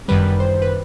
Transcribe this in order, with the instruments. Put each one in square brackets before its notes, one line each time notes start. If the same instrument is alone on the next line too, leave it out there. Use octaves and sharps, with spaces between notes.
[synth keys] G1 F#2 D#3 G3 B4
C5
B4